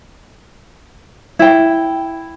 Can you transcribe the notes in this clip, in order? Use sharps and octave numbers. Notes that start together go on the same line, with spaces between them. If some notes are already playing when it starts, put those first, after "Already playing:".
E4 G5